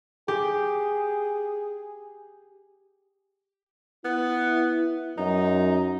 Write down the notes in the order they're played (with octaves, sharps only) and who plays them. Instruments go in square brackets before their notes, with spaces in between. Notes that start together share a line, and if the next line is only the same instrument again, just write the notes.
[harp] G4 [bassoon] G#4
[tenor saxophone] B3 [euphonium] E4
[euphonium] F#2 [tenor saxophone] D#4